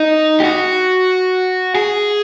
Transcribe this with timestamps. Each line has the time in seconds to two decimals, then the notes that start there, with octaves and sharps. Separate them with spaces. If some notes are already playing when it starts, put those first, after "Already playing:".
Already playing: D#4
0.40 G4
0.44 F#4
1.75 G#4